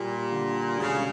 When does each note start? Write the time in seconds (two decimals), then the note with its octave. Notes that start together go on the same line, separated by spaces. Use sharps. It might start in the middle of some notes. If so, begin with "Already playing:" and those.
Already playing: A#2 G3
0.32 D3
0.79 E1 C#3